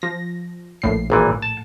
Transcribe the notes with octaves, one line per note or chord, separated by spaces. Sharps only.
F3 A#6
A#1 A2 C7
G#1 A#2 E3
A5